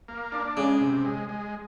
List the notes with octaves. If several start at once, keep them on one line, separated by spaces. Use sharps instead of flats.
A#3
D4
C#3 G#3
C3
G#3
G#3